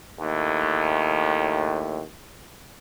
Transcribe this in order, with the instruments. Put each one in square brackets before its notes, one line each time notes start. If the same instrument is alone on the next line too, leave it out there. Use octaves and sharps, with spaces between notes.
[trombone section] D#2 A2